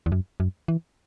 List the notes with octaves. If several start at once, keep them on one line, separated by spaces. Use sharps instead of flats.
E2
F#2
F#2
E3